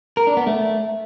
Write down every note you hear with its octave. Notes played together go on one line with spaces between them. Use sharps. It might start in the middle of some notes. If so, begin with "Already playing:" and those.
A#4
D4
B3
A3